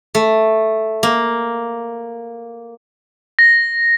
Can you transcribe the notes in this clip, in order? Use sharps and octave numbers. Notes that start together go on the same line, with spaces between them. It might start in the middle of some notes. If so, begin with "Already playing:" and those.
A3
A#3
A#6